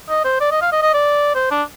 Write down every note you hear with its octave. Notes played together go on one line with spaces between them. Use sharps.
D#5
C5
D5
D#5
F5
D#5
D#5
D5
C5
D4